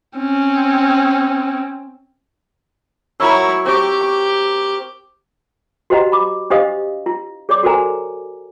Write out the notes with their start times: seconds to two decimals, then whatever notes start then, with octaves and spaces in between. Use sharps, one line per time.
0.17 C4 C#4
3.20 F#3 E4 A#4 C#5 E6
3.66 C4 G4 C#6
4.01 D6
5.90 F#4 G4 C5 D#5 F#5 A#5
6.12 B5 D6
6.50 D4 G4 C5 D#5 F5 D#6
7.06 E4
7.49 G#4 C#5 D5 D6
7.63 F#4 A4 A#4 C5 G#5 A#5